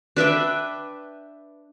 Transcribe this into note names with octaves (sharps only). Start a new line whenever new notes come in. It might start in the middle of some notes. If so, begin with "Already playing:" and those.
D4 B4 E5 G5